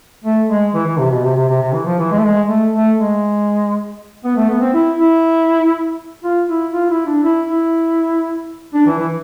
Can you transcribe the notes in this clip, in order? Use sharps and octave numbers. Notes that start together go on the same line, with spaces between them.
A3
G#3
E3
E3
C3
B2
C3
C3
C3
C3
E3
F3
E3
G#3
A3
G#3
A3
A3
G#3
B3
A3
B3
C4
E4
E4
F4
E4
F4
E4
D4
E4
E4
D4
E3
E3